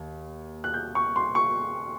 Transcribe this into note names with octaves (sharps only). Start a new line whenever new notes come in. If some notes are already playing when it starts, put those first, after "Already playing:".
Already playing: D#2
F#6
G6
C#6
C6
C#6